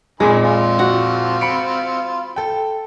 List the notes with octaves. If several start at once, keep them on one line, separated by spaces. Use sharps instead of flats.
F2 A#2 D#3 F3 G#3 G#5 B5
C4 F4
F#4
B5 C#7 D7
A4 G5